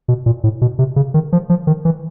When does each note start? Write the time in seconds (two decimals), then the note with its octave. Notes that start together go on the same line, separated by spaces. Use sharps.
0.08 B2
0.26 A#2
0.44 A2
0.61 B2
0.79 C3
0.96 C#3
1.14 D#3
1.33 F3
1.49 F3
1.67 D#3
1.85 E3